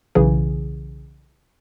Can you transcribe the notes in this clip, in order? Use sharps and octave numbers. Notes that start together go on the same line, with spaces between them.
B1 C#3 E3 G#4